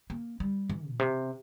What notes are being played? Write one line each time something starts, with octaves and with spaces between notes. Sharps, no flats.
A#3
G3
E3
A#2
C3